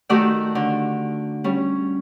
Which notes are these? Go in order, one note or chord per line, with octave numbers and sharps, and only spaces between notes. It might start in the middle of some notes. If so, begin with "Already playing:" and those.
D#3 A3 F#4 G4 D5 E6
D3
G3 C#4